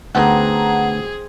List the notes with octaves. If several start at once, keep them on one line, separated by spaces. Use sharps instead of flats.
D2 B3 C4 D#4 G#4 F#5 A5 A#5